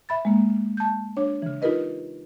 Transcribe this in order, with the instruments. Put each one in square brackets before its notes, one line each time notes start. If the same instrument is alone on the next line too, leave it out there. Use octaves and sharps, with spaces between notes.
[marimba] E5 B5 A6
G#3 A#3
A5 G6
D4 C#5
C#3 E3
D#4 F4 G4 A#4 B4 D#5